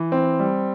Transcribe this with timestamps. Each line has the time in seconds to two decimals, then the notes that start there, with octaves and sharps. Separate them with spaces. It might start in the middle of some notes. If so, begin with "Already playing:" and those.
Already playing: E3
0.12 C4
0.39 G3